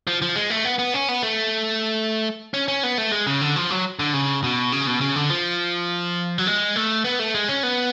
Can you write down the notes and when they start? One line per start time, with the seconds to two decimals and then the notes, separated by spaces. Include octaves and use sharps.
0.07 F3
0.22 F3
0.36 G#3
0.50 A3
0.65 B3
0.79 B3
0.94 C#4
1.08 B3
1.23 A3
2.54 C#4
2.68 C#4
2.83 B3
2.98 A3
3.12 G#3
3.27 C#3
3.41 D3
3.56 F3
3.70 F#3
3.99 D3
4.13 C#3
4.44 B2
4.72 C#3
4.87 B2
5.01 C#3
5.16 D3
5.30 F3
6.38 F#3
6.47 G#3
6.76 A3
7.05 B3
7.19 A3
7.35 G#3
7.48 C#4
7.63 B3